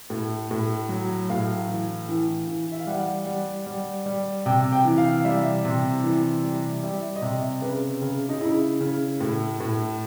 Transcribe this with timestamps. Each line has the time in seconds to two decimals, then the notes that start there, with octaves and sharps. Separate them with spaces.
0.10 A2
0.51 A2
0.89 F#3
1.29 A2 F5
1.68 E3
2.09 E3
2.48 E3
2.72 E5
2.80 F5
2.87 G3 F#5
3.26 G3
3.66 G3
4.06 G3
4.46 C3 G5
4.72 G5
4.85 E3
4.98 F5
5.24 G3 E5
5.65 C3
6.04 E3
6.43 G3
6.83 G3 E5
7.16 D#5
7.22 C3 E5
7.61 C#3 B4
8.01 C#3
8.29 D#4
8.40 C#3 E4
8.81 C#3
9.21 A2
9.60 A2